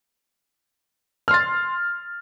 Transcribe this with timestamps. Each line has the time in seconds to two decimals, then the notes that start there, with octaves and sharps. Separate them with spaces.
1.28 F6
1.31 C6
1.34 A6